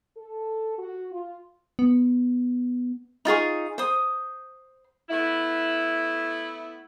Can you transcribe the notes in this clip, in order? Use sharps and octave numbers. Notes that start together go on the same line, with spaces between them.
A4
F#4
F4
B3
D#4 F4 G#4 C#6
C5 D#6
A3 B3 E4